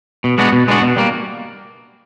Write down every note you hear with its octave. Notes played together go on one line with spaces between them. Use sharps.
B2
G#3 B3 D4 F#4
B2
G#3 B3 D4 F#4
B2
G3 A#3